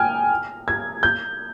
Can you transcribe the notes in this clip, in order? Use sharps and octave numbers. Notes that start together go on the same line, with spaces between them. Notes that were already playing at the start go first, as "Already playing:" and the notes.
Already playing: G5 G#5 F6
G#6
G6